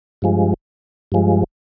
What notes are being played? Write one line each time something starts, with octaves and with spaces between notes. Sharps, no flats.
G2 F3 G#3
G2 F3 G#3